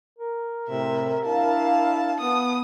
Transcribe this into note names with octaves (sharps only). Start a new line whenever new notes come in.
A#4
A2 C3 E5
D4 E4 F5 A5
B3 D#6